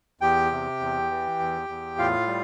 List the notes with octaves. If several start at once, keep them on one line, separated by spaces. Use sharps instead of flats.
E2 G4 G5
C3
E2
E3
E2
E2
A2 F4 F5
G3